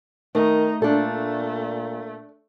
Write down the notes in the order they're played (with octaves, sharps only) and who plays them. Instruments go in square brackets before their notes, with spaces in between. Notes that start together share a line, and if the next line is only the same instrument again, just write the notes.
[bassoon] D#3 [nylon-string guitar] A3 [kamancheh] D#4
[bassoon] A#2 [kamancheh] A3 [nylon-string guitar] D4 A4